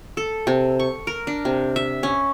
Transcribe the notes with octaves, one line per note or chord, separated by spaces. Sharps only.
A4
C3
C#6
A#4
D4
C3
E5
C#4